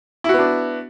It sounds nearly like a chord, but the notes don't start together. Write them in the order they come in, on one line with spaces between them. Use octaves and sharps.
E4 F#4 B3 D4